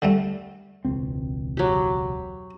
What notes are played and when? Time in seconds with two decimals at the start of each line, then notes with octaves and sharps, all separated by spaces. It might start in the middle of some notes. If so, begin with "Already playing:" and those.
0.02 D3 G3 A3
0.85 E1 C#2 C4
1.57 F#3 G4